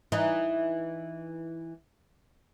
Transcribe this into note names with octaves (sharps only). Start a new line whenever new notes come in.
E3 D#4